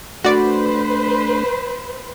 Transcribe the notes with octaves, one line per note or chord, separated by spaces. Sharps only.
A3 D4 F#4 B4 C5 D5